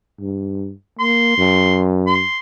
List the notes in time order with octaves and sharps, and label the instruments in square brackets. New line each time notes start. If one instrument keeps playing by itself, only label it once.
[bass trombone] G2
[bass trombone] A#3 [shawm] C6
[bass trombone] F#2
[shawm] C6